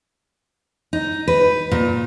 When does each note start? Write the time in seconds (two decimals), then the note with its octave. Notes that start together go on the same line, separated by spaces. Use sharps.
0.93 D#4
1.28 B4
1.71 A#2